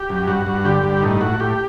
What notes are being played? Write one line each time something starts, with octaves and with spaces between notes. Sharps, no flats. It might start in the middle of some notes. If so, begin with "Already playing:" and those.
Already playing: G4
F#2
G2 F#4
G2
D3 G4
G2
A2 D#4
A2 F#4
A2 G4